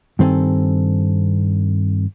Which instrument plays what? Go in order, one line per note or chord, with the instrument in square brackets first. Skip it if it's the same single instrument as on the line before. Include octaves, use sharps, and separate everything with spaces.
[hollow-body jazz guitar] G2 D#3 C4 A4 G#5